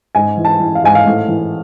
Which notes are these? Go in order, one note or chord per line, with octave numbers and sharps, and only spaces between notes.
G#2 G#5
E3
A5
E3
F5
G#2 G#5
F5
A2
E3